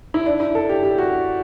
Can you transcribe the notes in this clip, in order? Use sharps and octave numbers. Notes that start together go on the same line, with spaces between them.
E4
D4
E4
A4
G4
G4
F#4